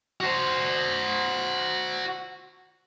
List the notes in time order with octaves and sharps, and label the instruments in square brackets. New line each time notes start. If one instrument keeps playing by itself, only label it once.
[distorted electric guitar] F#4 C5